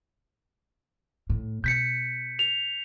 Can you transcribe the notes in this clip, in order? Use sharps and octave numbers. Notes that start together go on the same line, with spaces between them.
A2
B2 G6 B6 C#7
F7